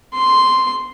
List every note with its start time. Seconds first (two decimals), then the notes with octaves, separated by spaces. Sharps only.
0.14 C6